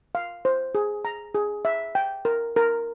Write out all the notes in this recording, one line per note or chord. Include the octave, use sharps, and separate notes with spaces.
F5
C5
G#4
A#5
G#4
E5
G5
A#4
A#4